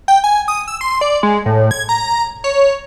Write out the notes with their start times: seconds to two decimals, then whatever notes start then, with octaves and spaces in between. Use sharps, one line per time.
0.08 G5
0.24 G#5
0.48 D#6
0.68 E6
0.81 C6
1.01 D5
1.23 G#3
1.45 A2
1.71 G#6
1.89 A#5
2.44 C#5